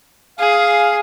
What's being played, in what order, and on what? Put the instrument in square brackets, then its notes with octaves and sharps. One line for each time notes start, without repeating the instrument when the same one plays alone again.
[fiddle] G#4 [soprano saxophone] F5